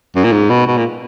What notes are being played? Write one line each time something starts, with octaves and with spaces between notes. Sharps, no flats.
F#2
A#2
G#2
B2
B2
A#2